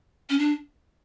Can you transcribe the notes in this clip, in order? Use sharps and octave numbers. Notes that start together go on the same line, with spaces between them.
C#4
D4